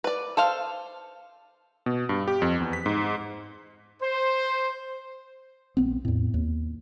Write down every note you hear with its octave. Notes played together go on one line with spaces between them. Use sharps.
B4 D5
A4 C5 F5
B2
G2
G4
F2
E2
B6
G#2
C5
A#1 B3 C4
E2 A2
D#2